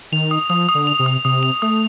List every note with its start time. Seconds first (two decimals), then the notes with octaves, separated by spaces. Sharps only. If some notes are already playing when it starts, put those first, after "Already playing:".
0.12 D#3 F7
0.31 D#6
0.50 F3 D#6
0.69 D#6
0.75 D3
0.87 F7
0.99 C3
1.06 D#6
1.25 C3 D#6
1.43 F7
1.62 A3 D#6